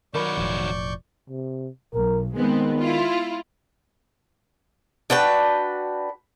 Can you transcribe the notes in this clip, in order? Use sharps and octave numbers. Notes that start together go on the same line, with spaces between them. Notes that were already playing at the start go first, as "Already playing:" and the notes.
D#3 F#3 A#4 D5 B5 C#6 G6
E1 A2 F3
C3
B1 A#4
D#3 G#3 B3 C4
E4 F4
D4 F#4 B4 G5